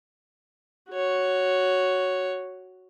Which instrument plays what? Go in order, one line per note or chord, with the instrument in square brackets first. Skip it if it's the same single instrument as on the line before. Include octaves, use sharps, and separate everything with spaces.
[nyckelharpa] F#4 C#5